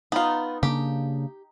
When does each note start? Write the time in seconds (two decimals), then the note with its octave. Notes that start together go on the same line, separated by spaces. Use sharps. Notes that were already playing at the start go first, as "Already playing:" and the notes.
0.12 B3 D#4 F4
0.63 C#3 A#3 D4 G4